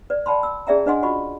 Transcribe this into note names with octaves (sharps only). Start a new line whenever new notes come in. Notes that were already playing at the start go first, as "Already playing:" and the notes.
B4 D5
D5 G5 A5 B5 C6
E6
C#4 G#4 D5 E5 G5 A#5
D4 B4 D#5 F#5 G#5 C6
F4 F#4 D#5 B5 C#6